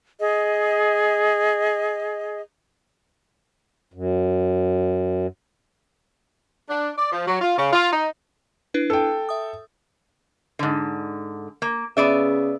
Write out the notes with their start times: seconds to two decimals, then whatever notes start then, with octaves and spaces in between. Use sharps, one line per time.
0.20 G#4 D#5
3.94 F#2
6.70 D4
6.97 D5
7.13 F3
7.28 F#3
7.41 F4
7.58 C#3
7.73 F4
7.93 D#4
8.74 D4 E4 B4
8.90 A4 G5
9.29 E5 D#6
10.59 G#2 D3
11.62 A#3
11.97 C#3 B3 D5 E5